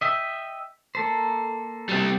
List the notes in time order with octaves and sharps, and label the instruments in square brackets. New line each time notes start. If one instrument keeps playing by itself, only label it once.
[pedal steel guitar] D#5 E5 G5
A#3 A4 C5
[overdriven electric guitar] G3 C4